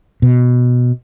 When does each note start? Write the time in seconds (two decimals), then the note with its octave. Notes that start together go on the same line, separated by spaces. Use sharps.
0.22 B2